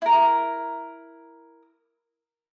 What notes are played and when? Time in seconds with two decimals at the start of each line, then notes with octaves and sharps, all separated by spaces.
0.02 E4 A#4